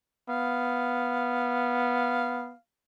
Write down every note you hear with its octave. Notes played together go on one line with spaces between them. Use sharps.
B3 F5